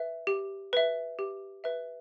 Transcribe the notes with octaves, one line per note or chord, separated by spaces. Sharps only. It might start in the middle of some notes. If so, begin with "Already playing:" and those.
Already playing: B4 E5
G4
B4 E5
G4
B4 E5